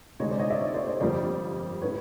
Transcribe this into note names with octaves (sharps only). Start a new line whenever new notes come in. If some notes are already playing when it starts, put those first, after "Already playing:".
D2 C3 D#3 G#3 C#5 D#5
C5 D5
C#5 D#5
D5 E5
C#5 D#5
C5 D5
C5 D5
G1 F2 D3 G3 A#3 C5 D5
A2 B4 C#5